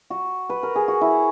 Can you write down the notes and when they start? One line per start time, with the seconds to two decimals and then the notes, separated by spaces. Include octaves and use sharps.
0.10 F#4
0.50 B4
0.63 A#4
0.76 G#4
0.88 F#4
1.01 E4